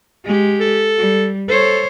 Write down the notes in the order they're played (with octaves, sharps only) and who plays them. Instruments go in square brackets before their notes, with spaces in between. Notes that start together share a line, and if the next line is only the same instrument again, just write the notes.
[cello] G#3 G4
[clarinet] A4
[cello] G3
[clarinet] A4 [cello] C5 C#5